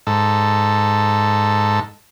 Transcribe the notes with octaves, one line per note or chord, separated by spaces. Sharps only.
G#2 A4